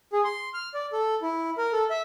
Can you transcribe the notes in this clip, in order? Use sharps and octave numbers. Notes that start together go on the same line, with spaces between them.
G#4
C6
F6
D5
A4
E4
A#4
A4
E5